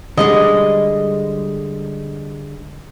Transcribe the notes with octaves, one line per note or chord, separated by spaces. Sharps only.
D3 G3 G#3 D#5